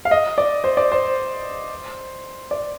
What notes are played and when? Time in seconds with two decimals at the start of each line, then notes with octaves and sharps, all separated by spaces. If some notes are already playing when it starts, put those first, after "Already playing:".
0.05 F5
0.11 D#5
0.38 D5
0.64 C5
0.77 D5
0.92 C5
2.51 D5